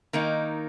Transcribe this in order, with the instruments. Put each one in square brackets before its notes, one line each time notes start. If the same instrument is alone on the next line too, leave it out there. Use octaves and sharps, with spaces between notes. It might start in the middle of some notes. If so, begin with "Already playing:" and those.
[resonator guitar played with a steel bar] D#3 A#3 D#4